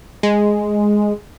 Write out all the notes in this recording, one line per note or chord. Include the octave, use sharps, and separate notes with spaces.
G#3